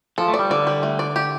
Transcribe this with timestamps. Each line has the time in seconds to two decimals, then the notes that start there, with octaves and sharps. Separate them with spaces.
0.18 F3 A4
0.28 A3
0.34 D5
0.39 G3
0.50 D3 D5
0.67 G3
0.83 A3
0.99 D5
1.16 G4